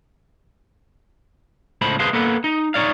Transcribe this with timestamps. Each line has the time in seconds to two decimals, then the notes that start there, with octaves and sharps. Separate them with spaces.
1.81 C#2 A2 C5 A5 B5
1.99 G#4 B4 C5 F5 A5
2.13 A#3 B3 A4 B4
2.44 D#4
2.74 D#4 C#5 D5 F5